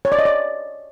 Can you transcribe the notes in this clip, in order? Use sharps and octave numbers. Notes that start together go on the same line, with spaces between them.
C#5
D5
D#5
D5